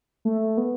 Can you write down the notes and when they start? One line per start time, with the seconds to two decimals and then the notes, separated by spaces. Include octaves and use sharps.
0.25 A3
0.57 B3